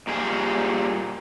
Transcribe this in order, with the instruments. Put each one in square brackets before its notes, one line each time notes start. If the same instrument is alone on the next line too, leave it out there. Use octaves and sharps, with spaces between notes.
[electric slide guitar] A#2 G3 G#4